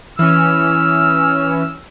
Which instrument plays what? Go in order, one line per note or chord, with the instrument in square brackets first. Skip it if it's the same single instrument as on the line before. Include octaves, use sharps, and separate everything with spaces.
[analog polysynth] E3 C#4 [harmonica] E6 F6